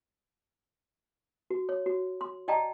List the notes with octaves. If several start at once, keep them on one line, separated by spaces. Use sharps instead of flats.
F#4
C#5
F#4
C6
D5 D#5 G5 A5 A#5